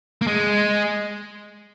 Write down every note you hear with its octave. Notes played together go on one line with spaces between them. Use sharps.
A#3
G#3